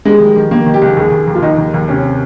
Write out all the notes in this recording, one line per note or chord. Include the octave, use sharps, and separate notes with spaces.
G3 G#3
D#3
D#3
D#3 A#3
D#3
G4
C#2
D#2 G#4
D#2
D#2
F4
D#2 D#4
D#2
D#2
C3 C#4
C3